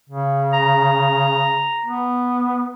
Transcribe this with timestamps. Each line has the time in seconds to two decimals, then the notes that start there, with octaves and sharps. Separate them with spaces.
0.10 C#3
0.53 A#5
1.86 B3